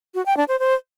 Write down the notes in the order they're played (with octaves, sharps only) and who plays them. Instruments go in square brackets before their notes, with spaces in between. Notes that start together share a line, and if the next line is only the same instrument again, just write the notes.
[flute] F#4
G5
D4
C5
C5